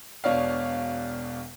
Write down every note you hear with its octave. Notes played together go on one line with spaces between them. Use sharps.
E1 B2 D4 C#5 D5 F5